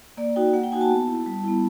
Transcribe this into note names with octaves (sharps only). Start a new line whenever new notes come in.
A#3 D5
D#4 F#4 G5
A#3 F#5
G5
D#4 F#4 G#5
A5
B3
E4
G3
B3 E4